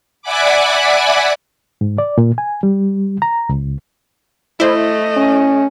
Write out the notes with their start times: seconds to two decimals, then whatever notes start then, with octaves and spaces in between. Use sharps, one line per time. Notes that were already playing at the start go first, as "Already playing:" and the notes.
0.22 D5 E5 F#5 G#5 B5 D6
1.81 G#2
1.98 D5
2.18 A#2
2.38 G#5
2.63 G3
3.22 A#5
3.49 C#2
4.60 A3 E4 C5 D#5
5.17 C#4